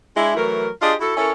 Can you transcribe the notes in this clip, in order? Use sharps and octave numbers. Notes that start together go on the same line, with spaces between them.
G#3 D4 E4
E3 F#3 A3 A#4
D4 F4 G4 G#4 D#5
E4 F#4 A4
C#4 E4 A4 A#4 C#5